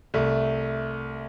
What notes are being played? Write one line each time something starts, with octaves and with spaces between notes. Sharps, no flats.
C2 A3